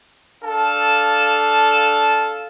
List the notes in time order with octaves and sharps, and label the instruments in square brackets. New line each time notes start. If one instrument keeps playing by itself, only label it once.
[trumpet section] D4 A4 F5 A5